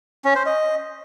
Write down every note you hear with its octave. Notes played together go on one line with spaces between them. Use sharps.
C#4
C5
D#5